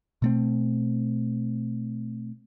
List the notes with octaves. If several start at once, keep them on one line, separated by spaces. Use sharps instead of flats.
B2 A3 C4